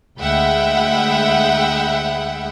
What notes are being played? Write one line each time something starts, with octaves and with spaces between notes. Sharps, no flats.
D2 G#3 E5 F#5 G5 B5